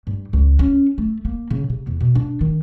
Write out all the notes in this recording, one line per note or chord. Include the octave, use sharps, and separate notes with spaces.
G2
C#2
C#4
A3
A#3
C#3
C3
E2
B2
D4
D#3